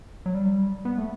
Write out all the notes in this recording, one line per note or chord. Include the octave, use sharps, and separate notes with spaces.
F#3
G3
B3
A3